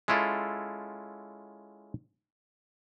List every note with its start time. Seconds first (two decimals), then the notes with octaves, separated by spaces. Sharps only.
0.08 G#3 C#4 E4 F4 A4